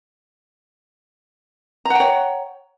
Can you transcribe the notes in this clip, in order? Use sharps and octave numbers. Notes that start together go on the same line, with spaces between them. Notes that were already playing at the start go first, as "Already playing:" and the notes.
C#5 F#5 G5 A#5